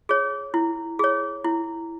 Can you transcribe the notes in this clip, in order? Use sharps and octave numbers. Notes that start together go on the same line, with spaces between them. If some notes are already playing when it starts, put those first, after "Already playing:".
G#4 C#5
E4
G#4 C#5
E4